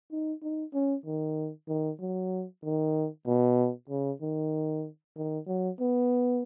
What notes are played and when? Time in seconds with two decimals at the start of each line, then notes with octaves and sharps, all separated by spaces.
0.12 D#4
0.43 D#4
0.73 C#4
1.06 D#3
1.69 D#3
2.01 F#3
2.64 D#3
3.27 B2
3.90 C#3
4.21 D#3
5.17 D#3
5.47 F#3
5.80 B3